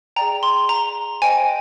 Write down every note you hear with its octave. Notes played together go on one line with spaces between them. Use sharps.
G#4 D5 G5 A#5
C6
A#5
C5 D#5 G5 G#5